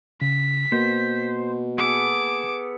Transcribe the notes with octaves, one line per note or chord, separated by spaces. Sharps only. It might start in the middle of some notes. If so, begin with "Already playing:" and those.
C#3 B6
B2 A#3 C5
B3 G#4 A4 D6